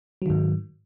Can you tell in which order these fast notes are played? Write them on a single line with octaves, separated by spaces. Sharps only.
F#3 D#3 G#2